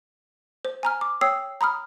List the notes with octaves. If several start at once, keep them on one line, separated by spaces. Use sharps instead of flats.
C5
G#5 A#5 F6
D6
C#5 G5 D#6 E6 C7
A#5 B5 D#6 F6